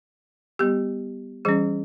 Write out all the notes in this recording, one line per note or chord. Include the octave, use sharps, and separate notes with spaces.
G3 B3 G4
E3 G3 C#4 G#4